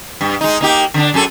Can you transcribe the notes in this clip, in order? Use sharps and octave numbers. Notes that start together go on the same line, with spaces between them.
G2
G#3 D#4
A#3 D#4 G4
D3 D4
F#2 G#4 A4